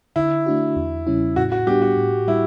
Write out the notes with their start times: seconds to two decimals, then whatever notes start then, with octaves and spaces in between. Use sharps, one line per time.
0.16 D3 E4
0.46 A3 D4 F#4
0.76 E2
1.07 C#3 G3 C#4 E4
1.36 A2 F#4
1.52 F#4
1.67 G3 B3 D4 G4
1.82 F#4
1.97 A2
2.28 G3 E4